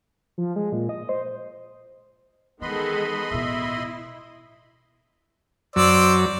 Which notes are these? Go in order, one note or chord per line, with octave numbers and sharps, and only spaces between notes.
F3
G#3
A#2
D#5
C5
D#3 E3 G#3 B3 A4 D#5 B5 C6
A1 B2 E4 E5
F#2 F#3 C5 D5 E6